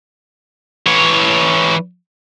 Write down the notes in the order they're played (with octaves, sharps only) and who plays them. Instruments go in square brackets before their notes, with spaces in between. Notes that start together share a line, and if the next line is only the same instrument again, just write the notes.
[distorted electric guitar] E3 C#5